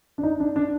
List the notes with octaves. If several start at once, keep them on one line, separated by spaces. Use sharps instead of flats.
D4
D#4
D4
D4